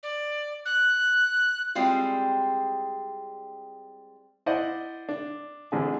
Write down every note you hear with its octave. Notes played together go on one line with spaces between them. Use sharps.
D5
F#6
G3 G#3 C4 E4 F4
E4 C5 D5 D#5 F#5
D4
A1 D3 C4 D4 G#4